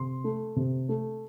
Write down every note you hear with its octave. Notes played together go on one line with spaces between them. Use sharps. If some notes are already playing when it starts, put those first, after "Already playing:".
Already playing: C3 C6
A3
C3
A3